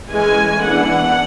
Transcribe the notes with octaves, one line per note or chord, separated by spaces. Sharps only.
E3 G#3 C#4 G#5
E3 B3 D4 F#5